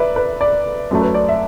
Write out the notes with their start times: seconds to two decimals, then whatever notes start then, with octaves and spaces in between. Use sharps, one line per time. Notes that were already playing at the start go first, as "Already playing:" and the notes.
Already playing: B4 D5 E5
0.16 B4
0.41 D5
0.91 F#2 F#3 A3
1.01 B4
1.14 D5
1.29 E5